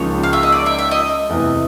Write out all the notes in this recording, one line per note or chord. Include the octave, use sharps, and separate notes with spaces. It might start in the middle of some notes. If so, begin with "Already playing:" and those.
Already playing: C#2 C#3 F3 A#3 D#4 C#5
F5
E5
D#5
D5
E5
E5
D#5
E2 C3 E3 A3